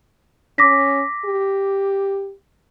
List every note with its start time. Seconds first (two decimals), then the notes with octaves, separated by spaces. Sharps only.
0.58 C#4 D6 A#6 B6
1.25 G4